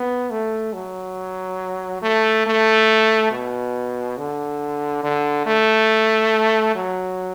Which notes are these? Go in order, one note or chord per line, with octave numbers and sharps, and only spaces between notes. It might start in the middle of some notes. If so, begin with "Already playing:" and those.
Already playing: B3
A3
F#3
A3
A3
B2
D3
D3
A3
F#3